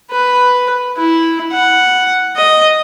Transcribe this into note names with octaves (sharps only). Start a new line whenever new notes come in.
B4
E4
F#5
D#5